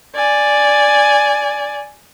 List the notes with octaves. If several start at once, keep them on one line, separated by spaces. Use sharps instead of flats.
D5 G#5